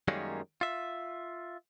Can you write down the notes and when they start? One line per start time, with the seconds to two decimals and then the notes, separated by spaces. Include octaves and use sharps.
0.08 F#2 D#3 G3 G#3 A#3 C#4
0.61 F4 E5